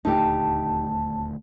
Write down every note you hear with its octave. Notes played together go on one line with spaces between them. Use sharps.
D#1 D2 A3 D#4 G4 A5